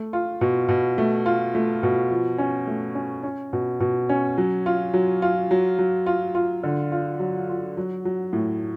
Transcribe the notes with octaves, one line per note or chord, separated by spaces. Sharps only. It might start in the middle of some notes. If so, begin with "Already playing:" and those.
Already playing: A3
F4
B2
B2
A3
F4
A3
B2
F3
C#4
A3
C#4
C#4
B2
B2
C#4
F#3
F4
F#3
F4
F#3
F#3
F4
F4
D3
F4
F#3
F4
F#3
F#3
A2